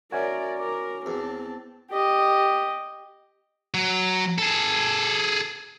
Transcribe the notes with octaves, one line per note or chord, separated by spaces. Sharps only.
C#4 F#4 A#4 D5 E5 G#5 G#6
A#4 D6
E2 C4 A5
G4 D#5
F#3
G#4 A4